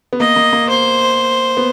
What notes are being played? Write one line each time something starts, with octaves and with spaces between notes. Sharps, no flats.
B3
A#3 D#5
A#3
A#3
C5
B3